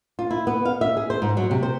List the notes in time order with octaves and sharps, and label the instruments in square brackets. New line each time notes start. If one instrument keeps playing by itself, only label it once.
[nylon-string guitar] F4
E4
B3
F5
E5
G#4
C5
G#2
F#3
C3
C5